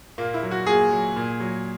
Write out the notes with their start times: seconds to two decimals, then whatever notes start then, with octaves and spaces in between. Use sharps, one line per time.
0.18 A#2 A#3
0.34 E4
0.43 F#3
0.51 F#4
0.67 A#2 G#4
0.91 F#3
1.16 A#2
1.40 F#3